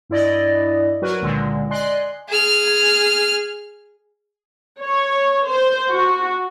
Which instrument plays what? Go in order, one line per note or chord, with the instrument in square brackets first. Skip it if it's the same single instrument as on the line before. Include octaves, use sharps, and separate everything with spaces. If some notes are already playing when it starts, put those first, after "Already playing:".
[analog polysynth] G2 E4 D5 D#5
F#3 F#4 A#4 B4
C#2 A#2 D3 G#3
D5 D#5 G#5 C6 F#6 C7
[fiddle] G#4 F6
[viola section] C#5
C5
F#4